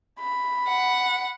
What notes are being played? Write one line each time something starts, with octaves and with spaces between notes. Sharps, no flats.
B5
F#5